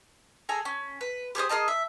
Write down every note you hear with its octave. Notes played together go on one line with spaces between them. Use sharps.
G#4 A4 G#5 A#5
C#4
B4
G4 G#4 C5 D#6
G#4 A#4 D#5 A5
E5